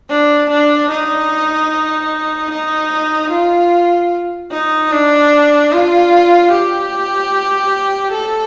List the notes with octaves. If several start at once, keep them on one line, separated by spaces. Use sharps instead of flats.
D4
D4
D#4
D#4
F4
D#4
D4
F4
G4
A4